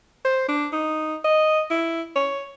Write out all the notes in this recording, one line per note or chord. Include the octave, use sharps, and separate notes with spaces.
C5
D4
D#4
D#5
E4
C#5